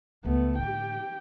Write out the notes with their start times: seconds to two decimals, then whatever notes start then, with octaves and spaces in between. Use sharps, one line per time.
0.25 C#2 A3 B3
0.59 A2 D3 G4 G5